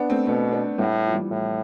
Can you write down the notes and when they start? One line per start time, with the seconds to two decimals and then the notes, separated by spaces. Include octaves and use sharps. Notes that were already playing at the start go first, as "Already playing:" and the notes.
Already playing: B3 D4
0.10 A3 C4
0.27 B2 A3 C4
0.52 B3 D4
0.78 A2 G3 B3
1.06 F3
1.13 E3 G3
1.31 A2